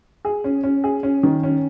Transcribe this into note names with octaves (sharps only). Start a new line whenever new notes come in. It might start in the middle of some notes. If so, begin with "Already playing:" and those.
G#4
C#4
C#4
G#4
C#4
D#3
C#4